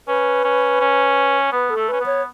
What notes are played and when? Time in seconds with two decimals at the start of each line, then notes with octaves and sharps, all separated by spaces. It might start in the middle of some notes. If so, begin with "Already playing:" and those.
0.08 C#4 B4
0.44 C#4
0.80 C#4
1.52 B3 B4
1.70 A4
1.76 A3
1.88 C#4 B4
2.01 B3
2.06 C#5